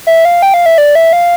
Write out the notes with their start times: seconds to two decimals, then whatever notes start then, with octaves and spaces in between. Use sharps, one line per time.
0.07 E5
0.25 F5
0.42 G5
0.54 F5
0.66 E5
0.78 D5
0.95 E5
1.13 F5